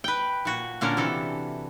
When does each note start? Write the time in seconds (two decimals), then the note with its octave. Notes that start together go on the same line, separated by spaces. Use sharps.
0.04 B4 G5
0.45 A#2 F#4
0.81 A#2 D3 C#4 D4 A#4
0.97 C3 E3 A4